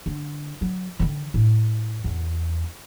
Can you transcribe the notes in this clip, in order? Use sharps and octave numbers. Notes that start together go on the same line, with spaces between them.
D3
F#3
D3 D#3
A2
E2